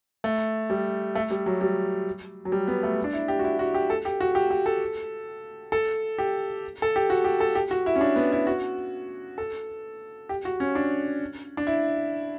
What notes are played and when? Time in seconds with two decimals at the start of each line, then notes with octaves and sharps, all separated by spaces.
0.24 A3
0.70 G3
1.15 A3
1.31 G3
1.46 F#3
1.61 G3
2.45 F#3
2.52 G3
2.68 B3
2.83 A3
3.04 D4
3.13 E4
3.28 G4
3.39 F#4
3.44 E4
3.59 F#4
3.74 G4
3.90 A4
4.05 G4
4.21 F#4
4.35 G4
4.51 G4
4.66 A4
5.72 A4
6.18 G4
6.82 A4
6.96 G4
7.10 F#4
7.24 G4
7.40 A4
7.55 G4
7.71 F#4
7.86 E4
7.96 C#4
8.01 D4
8.16 B3
8.32 E4
8.47 F#4
9.38 A4
10.29 G4
10.45 F#4
10.60 C#4
10.75 D4
11.57 D4
11.67 E4